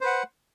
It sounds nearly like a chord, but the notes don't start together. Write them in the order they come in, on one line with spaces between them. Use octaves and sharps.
C5 B4 F#5